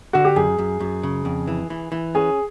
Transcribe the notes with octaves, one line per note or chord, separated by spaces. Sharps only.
D3 F#4
G4
F#2 G#4
F#2
F#2
C#3
F2
E3
E3
E3
C#4 G#4